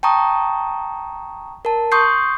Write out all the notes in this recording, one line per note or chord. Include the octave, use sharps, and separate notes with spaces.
G5 A5 A#5 C#6 D#6
A#4 A5
C6 C#6 D#6 G6 C7